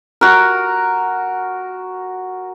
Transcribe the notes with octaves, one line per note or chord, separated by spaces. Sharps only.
F#4 A#4